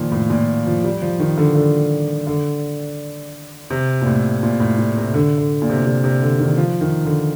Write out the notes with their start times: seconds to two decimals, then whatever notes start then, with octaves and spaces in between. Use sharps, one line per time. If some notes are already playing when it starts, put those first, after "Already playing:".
Already playing: A#2 D#3 F3
0.12 A2
0.30 A#2
0.66 F3
0.84 G3
1.02 F3
1.20 D#3
1.38 D3
1.55 D3
2.27 D3
3.70 C3
4.02 A#2
4.06 A2
4.43 A#2
4.60 A2
4.78 A#2
4.96 C3
5.14 D3
5.38 D3
5.62 A#2
5.69 C3
5.77 A#2
5.86 C3
6.04 C3
6.22 D3
6.39 D#3
6.58 F3
6.81 D#3
7.05 D3